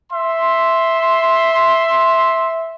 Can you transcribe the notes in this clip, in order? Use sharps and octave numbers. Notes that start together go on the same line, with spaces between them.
E5 C6